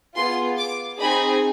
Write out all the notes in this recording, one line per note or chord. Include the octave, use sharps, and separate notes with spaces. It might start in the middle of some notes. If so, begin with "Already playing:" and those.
B3 F4 G#4 C6
D6
C4 D#4 G#4 B5